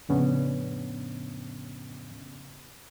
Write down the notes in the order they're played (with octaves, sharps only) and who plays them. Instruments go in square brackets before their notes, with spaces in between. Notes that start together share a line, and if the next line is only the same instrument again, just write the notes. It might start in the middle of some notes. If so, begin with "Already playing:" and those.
[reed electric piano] F2 A2 C#3 B3 C#4 D4